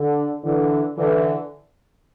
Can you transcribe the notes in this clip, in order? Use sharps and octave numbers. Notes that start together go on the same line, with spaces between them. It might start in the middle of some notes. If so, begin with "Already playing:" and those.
Already playing: D3
D3 E3
D3 E3